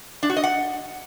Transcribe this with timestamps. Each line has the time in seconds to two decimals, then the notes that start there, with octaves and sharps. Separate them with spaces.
0.23 D4
0.30 F#4
0.37 D#5
0.43 F#5